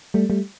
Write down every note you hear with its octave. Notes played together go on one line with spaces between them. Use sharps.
G3 A3
G3 A3